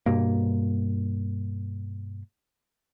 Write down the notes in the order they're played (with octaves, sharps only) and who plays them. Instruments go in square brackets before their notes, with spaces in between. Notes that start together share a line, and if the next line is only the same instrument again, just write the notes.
[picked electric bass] G2 B2 A#3